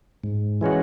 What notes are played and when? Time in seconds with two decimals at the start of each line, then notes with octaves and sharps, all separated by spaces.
0.24 G#2
0.61 E3 G#3 C#4 F#4